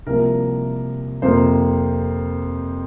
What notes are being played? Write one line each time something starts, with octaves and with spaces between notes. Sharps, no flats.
C2 C3 F3 A#3 A#4
F2 C3 A#3 C5